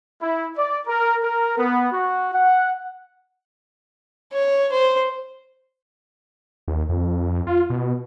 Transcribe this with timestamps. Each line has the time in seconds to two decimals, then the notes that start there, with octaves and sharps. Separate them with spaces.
0.22 E4
0.57 D5
0.87 A#4
1.23 A#4
1.58 B3
1.92 F#4
2.34 F#5
4.32 C#5
4.72 C5
6.68 D#2
6.89 F2
7.47 F4
7.70 B2